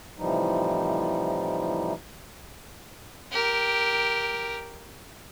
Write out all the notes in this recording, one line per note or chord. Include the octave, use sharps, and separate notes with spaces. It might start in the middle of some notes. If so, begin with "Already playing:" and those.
A2 C3 E3 F3 G3 D#4
G4 A#4